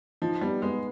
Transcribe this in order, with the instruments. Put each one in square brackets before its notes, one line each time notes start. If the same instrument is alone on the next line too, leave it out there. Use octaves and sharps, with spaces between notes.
[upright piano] F3 [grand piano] D#4
[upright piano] G3 [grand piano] B3
[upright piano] G#3 [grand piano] B3